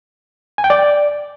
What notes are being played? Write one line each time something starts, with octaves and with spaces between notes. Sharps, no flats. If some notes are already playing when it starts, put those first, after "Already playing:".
G#5
G5
D5